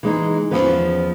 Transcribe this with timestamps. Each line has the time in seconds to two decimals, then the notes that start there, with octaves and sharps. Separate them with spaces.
0.03 E3 G#3 D#4
0.51 E2 B2 F3 B3 C#4 B4